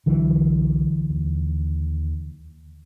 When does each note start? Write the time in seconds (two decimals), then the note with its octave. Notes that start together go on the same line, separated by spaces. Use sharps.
0.06 C2 D3 E3 F#3
1.10 D#2